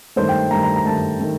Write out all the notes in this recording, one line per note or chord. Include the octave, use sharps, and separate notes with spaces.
G2 D#3 A3 C5
G5
G2 D#3 A3 A#5
A#5
A#5
G2 D#3 A3 A5
D#3 A3